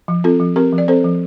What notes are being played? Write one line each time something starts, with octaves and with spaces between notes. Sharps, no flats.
F3
C4 F4 A4
F3
C4 G4 A#4
F3
D5
C4 A4 C5
F3